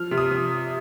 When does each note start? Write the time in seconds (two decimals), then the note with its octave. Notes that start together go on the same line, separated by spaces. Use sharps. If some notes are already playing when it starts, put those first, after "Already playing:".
Already playing: F3 F6
0.11 C3
0.18 D#6
0.31 F3